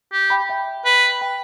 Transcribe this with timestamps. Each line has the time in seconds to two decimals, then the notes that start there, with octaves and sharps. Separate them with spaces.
0.13 G4
0.30 G5 B5
0.49 E5 G5
0.85 B4
1.21 G5 B5